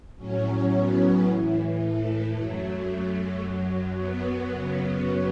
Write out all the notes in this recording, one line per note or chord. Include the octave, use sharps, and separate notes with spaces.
A2 F#3 C#4
B3
A2 E3
A3
F#2 F#3
F#2 F#3
B3
F#2 C#3 F#3 B3